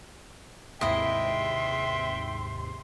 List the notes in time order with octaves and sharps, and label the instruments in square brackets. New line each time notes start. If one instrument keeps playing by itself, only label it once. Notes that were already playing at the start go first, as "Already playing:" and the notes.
[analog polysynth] D#2 G#2 C3 [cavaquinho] E4 D#5 [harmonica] E5 G5 [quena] C6